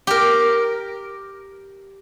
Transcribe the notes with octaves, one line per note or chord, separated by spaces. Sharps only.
G4 A#4